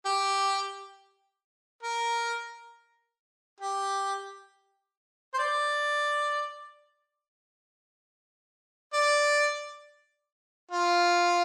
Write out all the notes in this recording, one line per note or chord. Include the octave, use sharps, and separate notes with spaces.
G4
A#4
G4
C5
D5
D5
F4